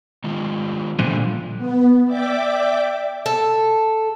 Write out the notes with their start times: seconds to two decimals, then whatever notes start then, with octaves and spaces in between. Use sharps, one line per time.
0.24 D#3 G#3 F4
0.99 A#2 D3 F3 G3 A3
1.58 B3
2.06 D5 E5 G5 D6
3.26 A4